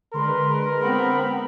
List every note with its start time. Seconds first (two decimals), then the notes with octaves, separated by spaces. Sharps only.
0.14 D3 G#3 A#4 B4 C6
0.81 B3 C4 B5